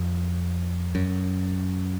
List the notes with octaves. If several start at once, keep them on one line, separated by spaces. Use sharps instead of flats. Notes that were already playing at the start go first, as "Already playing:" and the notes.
Already playing: F2
F#2